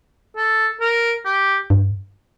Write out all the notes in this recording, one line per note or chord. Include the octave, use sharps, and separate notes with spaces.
A4
A#4
G4
G2